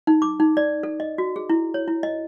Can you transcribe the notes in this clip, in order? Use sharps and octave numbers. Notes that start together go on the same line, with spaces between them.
D#4
D6
D#4
D5
A4
D#5
F#4
G#4
E4
C#5
E4
D#5